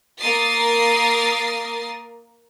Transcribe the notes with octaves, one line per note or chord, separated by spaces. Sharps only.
A#3 A#4 D#6 A6 C7